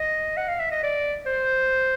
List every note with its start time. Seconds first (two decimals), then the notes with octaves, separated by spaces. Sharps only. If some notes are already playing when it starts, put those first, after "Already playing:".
Already playing: D#5
0.37 F#5
0.48 F5
0.60 E5
0.71 D#5
0.83 D5
1.26 C5